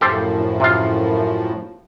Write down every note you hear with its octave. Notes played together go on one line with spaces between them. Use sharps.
F#2 A2 F3 G4 A4 C5
C3 F4